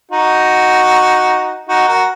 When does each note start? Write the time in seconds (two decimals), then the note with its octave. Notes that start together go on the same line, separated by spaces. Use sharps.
0.11 D#4 F#4
1.69 D#4 F#4
1.88 F#4 A#4